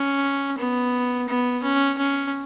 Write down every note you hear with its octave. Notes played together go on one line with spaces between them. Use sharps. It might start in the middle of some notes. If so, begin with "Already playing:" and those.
Already playing: C#4
B3
B3
C#4
C#4